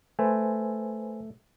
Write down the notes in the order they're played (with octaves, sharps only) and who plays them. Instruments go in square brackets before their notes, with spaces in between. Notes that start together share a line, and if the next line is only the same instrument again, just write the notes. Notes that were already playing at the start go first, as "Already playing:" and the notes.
[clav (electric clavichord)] A3 [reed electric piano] B4 C5 G#5